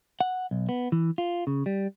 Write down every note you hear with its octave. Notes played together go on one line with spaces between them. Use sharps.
F#5
B1
B3
E3
F4
C#3
G3